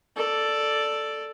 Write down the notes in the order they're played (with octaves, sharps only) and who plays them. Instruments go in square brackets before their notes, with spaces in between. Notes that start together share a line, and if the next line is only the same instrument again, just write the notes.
[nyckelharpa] A4 D5